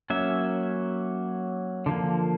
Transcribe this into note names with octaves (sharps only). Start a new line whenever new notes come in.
F#3 A#3 C#4 E5
D3 F3 A#3